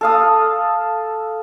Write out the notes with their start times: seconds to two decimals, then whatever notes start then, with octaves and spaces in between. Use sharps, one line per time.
0.01 A4 F5 D#6